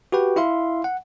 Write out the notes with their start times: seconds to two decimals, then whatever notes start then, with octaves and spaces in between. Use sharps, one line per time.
0.12 F#4 G4 B4 G5
0.36 E4 E5 F5 C6
0.84 F#5